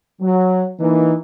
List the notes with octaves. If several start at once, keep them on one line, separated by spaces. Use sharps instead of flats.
F#3
E3 A#3 D#4